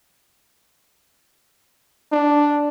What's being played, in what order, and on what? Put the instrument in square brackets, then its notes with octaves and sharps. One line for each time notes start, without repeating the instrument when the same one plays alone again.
[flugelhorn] D4